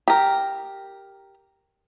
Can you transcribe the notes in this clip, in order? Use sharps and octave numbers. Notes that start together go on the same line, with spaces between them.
G4 A#4